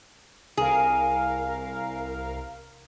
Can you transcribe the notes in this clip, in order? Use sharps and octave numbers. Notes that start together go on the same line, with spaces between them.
C2 G#4 A#4 F5